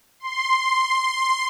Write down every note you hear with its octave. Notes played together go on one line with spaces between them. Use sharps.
C6